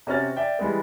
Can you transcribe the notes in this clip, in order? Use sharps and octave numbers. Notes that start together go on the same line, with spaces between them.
C3 C4 C#4 F#4 F6 A6
D5 E5 G5
E3 G3 G#3 B3